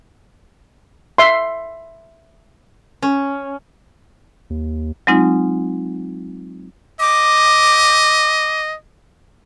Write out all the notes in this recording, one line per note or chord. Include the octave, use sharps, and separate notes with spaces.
E5 C6
C#4
D#2
F#3 G#3 C4 D#4 F4
D#5 D6